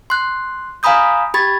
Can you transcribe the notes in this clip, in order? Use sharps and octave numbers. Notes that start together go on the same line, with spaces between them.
C6 F#6
F5 G#5 A#5 B5 D#6 G6
G4 B5 G#6 A6